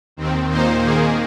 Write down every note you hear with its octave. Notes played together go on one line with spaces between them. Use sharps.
D#2 D#3 C4
A#2 A#3 D#4 C5
D#3 A#3 G#4